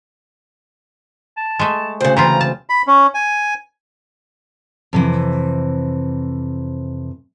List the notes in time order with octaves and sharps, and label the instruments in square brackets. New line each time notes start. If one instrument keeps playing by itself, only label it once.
[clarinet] A5
[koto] G#3 A3
[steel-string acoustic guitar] D2 C#3 [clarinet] C5
[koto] E3 C4 F4 [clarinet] A#5
[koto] A5
[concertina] B5
C#4
G#5
[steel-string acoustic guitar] F2 C3 E3